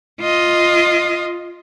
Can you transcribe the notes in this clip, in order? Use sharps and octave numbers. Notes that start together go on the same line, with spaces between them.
F4 D#5